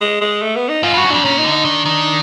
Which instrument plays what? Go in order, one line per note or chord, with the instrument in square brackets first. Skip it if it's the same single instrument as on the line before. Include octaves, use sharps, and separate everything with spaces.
[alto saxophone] G#3
G#3
A3
B3
D#4
[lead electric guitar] G#2 [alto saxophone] F4
[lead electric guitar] G2 [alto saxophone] F#4
[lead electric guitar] F#2
[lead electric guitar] F2 [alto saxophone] D4
[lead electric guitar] A#2 [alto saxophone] C#4
[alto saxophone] D#4
[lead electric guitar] D3
[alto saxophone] D#4
[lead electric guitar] D#3 [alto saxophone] D4
[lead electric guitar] D#3